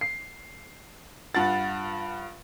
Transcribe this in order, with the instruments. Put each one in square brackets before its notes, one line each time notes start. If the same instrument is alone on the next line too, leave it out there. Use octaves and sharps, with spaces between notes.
[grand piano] C7
[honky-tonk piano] G2 F4 A6 [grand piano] F#5